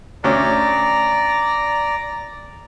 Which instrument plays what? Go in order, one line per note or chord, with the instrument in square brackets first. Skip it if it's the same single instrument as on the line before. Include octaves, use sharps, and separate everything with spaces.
[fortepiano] D2 C#4 [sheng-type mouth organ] D5 A#5